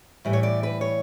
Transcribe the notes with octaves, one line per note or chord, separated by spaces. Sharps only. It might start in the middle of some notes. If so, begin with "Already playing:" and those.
A2 E3 G3
C#5
D5
B4
C#5